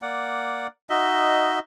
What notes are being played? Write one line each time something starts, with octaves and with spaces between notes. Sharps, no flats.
A#3 D5 F#5
D#4 F#4 D#5 E5